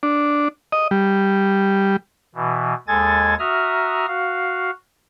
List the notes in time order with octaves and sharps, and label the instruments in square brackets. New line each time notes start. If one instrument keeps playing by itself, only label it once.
[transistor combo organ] D4
D#5
G3
[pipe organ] B2 E3
D#2 G#3 A4 G#5 G#6 A6
F#4 E5 A#5 D#6 F6
F#4 F5